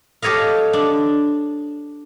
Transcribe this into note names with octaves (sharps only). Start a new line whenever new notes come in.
G4 A4 C#5 D#5 F5
D4